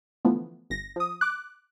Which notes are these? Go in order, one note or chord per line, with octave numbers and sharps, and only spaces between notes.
D3 E3 F3 A3 B3
G1 A#6
F3 D#6
D6 F#6